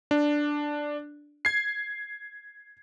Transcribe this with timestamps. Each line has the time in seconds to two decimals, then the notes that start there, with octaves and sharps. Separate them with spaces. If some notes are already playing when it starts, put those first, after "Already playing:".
0.11 D4
1.45 G#6 C7